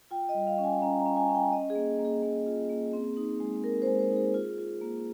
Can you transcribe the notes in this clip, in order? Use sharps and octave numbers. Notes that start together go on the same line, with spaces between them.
F4 G5
D#5
G3
F5
C#4
G#5
C#4 A#5
A#5
C#4
G#5
C#4
G5
C#4 D#5
G#4
A#3
A#3
G#4
A#3
F4
A#3
C4
D#4
G#3
C4 A#4
C5
G#3
C5
D#4
G#4
F4
F4
A#3